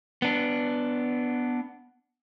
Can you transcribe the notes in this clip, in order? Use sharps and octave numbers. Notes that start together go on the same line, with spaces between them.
B3 D4